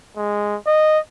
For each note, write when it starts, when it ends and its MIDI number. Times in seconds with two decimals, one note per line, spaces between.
0.16 0.56 56
0.67 0.99 75